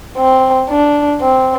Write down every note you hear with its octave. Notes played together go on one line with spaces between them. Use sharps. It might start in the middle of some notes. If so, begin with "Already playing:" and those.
C4
D4
C4